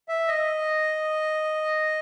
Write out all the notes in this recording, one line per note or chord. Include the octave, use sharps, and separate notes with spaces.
E5
D#5